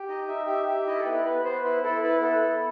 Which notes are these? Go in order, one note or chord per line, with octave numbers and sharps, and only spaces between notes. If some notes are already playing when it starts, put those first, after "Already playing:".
Already playing: G4
D#4 D#5
D#4 E5
G4 E5
G4 E5
E4 D#5
A4
B3 B4
B3 B4
B3 C5
E4 B4
E4 A4
E4 B4
B3 A4
A4